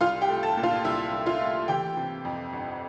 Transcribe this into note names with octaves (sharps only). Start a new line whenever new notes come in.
C2 F4 F5
G4 G5
A3
A4 A5
A#2
F4 F5
C2 E4 E5
C2
F4 F5
A3
E3 G4 G5
C3
F2
G1